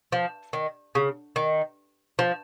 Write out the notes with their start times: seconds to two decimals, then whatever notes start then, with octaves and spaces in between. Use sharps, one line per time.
0.12 F3
0.53 D#3
0.95 C#3
1.36 D#3
2.19 F3